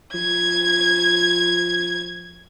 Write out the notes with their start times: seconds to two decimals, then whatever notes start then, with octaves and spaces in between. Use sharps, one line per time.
0.14 F3 G#6